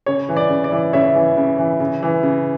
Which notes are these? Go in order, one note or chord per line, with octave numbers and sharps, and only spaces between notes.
C#3 C#5
E3
D5
C#3
D5
E3
C#3 C#5 E5
E3
C#3
E3
C#3
E3
C#3